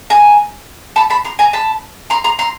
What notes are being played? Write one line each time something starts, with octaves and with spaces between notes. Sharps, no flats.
G#5 A#5
A5 B5
A5 B5
A#5 C6
G#5 A#5
A5 B5
A#5 C6
A#5 C6
A#5 C6